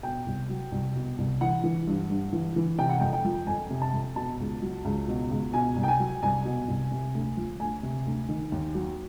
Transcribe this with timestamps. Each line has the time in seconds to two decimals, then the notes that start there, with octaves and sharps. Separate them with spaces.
0.03 B2 G5
0.26 C2
0.49 F#3
0.72 C2
0.95 B2
1.18 C2
1.41 E3 F#5
1.64 E3
1.87 G2
2.09 G2
2.33 E3
2.56 E3
2.78 C3 G5
2.89 F#5
3.00 F2 G5
3.13 G5
3.25 F3
3.47 F2 G#5
3.70 C3
3.82 A5
3.93 F2
4.16 B2 A5
4.39 C#2
4.62 F#3
4.85 C#2
5.08 B2
5.31 C#2
5.53 B2 G#5
5.76 C2
5.83 G5
5.88 G#5
5.99 F#3
6.23 C2 G#5
6.45 B2
6.68 C2
6.91 C3
7.15 D2
7.37 F3
7.60 D2 G#5
7.83 C3
8.06 D2
8.29 D#3
8.52 D#2
8.75 F#3